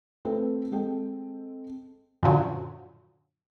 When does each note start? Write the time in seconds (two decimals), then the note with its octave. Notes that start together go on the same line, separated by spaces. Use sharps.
0.25 A3 C4 F4 A4 B4
0.72 G#3 C4 A4 G5
2.23 F#2 A#2 D3 F3 F#3